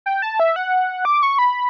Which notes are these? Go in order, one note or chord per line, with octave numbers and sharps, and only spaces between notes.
G5
A5
E5
F#5
D6
C#6
B5